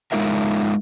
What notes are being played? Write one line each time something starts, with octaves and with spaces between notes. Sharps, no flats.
G#3 D#4 F4 A#4 E5